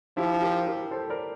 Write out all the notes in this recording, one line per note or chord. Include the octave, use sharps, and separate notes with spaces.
F3 E4 G4
G4 A#4
G4 A#4
A4 C5
A#4 D5